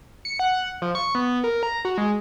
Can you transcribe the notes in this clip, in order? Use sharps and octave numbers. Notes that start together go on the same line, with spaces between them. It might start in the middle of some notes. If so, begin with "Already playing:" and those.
C#7
F#5
F3
C#6
B3
A#4
A#5
F#4
G#3